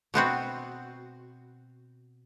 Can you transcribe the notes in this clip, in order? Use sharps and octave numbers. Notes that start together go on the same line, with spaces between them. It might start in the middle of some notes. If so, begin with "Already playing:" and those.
B2 B3 C4 F#4